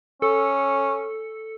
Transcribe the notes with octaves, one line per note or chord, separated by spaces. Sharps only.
C#4 A4